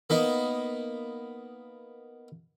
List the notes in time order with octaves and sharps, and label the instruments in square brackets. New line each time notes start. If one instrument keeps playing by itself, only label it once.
[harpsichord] A#3 B3 D#4